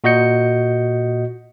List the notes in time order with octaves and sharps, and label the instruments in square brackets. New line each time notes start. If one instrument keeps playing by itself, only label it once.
[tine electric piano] A#2 F#4 D#5 G6 C#7